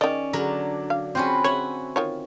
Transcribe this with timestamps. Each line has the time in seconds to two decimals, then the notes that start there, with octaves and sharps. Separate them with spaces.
0.01 D#3 C#4 D5 D#5
0.33 D3 F#3 D4 A#4
0.90 F5
1.15 C4 C#4 F4 F#4 B4
1.44 C#5 E5 F#5 G#5
1.96 D#3 F4 C#5